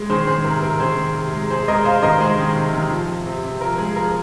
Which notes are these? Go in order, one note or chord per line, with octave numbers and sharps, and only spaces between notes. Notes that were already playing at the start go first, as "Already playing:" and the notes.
Already playing: G#3
D#3 G#4 C5
D#3 G#4 C5
C3 A#4
C3 A#4
D#3 G#4 C5
D#3
C3
G#3
C3 G#4 C5
G#3 A#4 D#5
C3 C5 F5
D#3 A#4 D#5
G#3 G#4 C5
D#3
C3
D#3
F3
C3
C3
C3
F3 A#4
G#3 G#4
F3 A#4